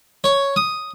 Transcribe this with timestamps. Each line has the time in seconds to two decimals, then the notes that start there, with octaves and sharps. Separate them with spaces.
0.24 C#5
0.56 D#6